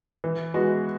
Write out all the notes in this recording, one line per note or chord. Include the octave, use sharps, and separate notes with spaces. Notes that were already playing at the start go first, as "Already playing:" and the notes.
E3
G#3 B3 F#4